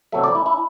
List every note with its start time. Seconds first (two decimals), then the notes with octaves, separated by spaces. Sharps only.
0.12 E2 C3 F#3 A3 E5
0.24 D5
0.35 E4
0.46 E4